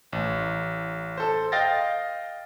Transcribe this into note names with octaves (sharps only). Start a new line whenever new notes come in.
A1
A4 C5
D#5 F5 G5 A6 A#6